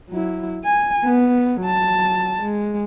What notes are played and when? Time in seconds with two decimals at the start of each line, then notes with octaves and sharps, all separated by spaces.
0.10 F#3 E4
0.64 G#5
1.05 B3
1.61 F#3 A5
2.42 G#3